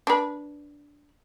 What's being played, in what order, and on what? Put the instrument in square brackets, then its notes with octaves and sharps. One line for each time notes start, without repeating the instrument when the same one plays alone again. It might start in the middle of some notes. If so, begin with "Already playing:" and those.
[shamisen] D4 B4